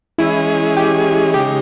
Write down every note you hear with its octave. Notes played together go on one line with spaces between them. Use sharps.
E3 G#3 C#4 E4 G#4 D#5
G4
C#3 G#3 D#4 G4